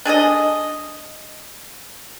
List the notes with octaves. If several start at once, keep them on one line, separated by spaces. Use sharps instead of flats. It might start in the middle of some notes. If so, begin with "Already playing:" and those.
D4 G#4 A4 D#5